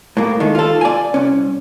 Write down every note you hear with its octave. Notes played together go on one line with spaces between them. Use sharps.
A2 A#3
D#3 G#3 A3
F4 A4
D5 G#5
C2 C#4